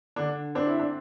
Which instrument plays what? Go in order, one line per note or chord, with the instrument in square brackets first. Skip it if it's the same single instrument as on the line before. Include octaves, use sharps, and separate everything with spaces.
[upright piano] D3 D4
C4 D4
E4
D4